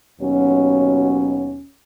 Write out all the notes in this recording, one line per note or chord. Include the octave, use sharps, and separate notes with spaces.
D#2 B2 F#3 C#4